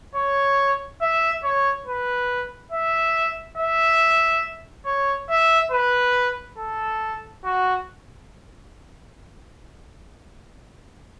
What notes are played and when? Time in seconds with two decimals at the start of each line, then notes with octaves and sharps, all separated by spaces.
0.15 C#5
1.01 E5
1.44 C#5
1.86 B4
2.72 E5
3.58 E5
4.86 C#5
5.30 E5
5.72 B4
6.58 A4
7.44 F#4